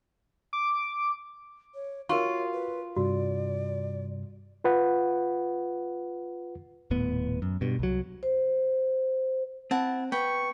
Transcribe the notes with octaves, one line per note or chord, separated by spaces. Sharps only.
D6
C#5
F4 F#4 A#4 C#5 C#6
B4
G2 C3 G3 F#4 D5
F4 B4 F#5
D#1 A2 B3
F#2
G2 B2
C2 F#3
C5
C4 E4 F#5 A5
B3 G5 C#6